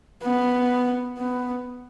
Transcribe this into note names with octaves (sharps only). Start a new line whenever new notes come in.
B3
B3